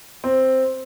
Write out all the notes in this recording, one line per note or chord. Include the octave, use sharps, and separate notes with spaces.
C4